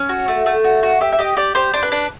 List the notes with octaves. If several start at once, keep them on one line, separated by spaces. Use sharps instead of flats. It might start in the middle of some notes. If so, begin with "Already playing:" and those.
Already playing: C#4
F#4
A3
A3
F#4
F#4
G4 E5
E5
G4 D#5
G4 D5
G4 C5
D4 C5
B4
D4